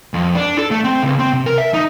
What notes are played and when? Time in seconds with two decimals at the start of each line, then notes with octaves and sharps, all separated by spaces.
0.14 F2
0.35 D4
0.58 A4
0.71 A3
0.84 C4
1.03 C#2
1.19 C4
1.33 C3
1.46 A#4
1.58 E5
1.74 D#4